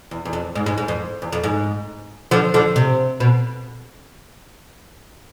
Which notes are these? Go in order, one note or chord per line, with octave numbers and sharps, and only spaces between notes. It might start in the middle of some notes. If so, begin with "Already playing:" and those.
E2
E2
F2
G#2
G#2
G#2
F2
E2
F2
G#2
D3 F3
D3 F3
C3
B2